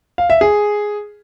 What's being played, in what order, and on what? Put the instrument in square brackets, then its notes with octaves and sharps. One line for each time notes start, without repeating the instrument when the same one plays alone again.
[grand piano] F5
E5
G#4